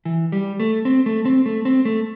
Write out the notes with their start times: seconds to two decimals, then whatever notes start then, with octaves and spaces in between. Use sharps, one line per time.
0.05 E3
0.32 G3
0.60 A3
0.85 C4
1.06 A3
1.25 C4
1.46 A3
1.65 C4
1.85 A3